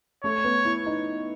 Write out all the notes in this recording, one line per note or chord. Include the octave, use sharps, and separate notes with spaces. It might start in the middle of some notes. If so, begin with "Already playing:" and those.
A3 C#5
B3
E4
D#4